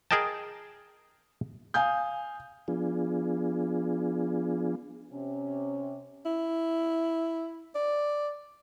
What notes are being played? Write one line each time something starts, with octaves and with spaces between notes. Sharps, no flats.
G#4 A#4 D#5 G5 A5
F5 G#5 D#6 G6
F3 B3 D4 F4 G#4
C3 C#4
E4
D5